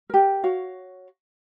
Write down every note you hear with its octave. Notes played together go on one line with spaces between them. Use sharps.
G4 A#4
F#4 C#5 F5